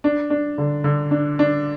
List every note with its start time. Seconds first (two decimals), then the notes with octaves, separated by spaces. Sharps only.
0.04 D4
0.30 D4
0.58 D3
0.84 D3
1.11 D4
1.39 D4